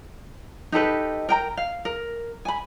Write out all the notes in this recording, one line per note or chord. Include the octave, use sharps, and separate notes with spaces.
D#4 G4 A4 B4
A#4 G5 A#5
F5
A#4
G#5 B5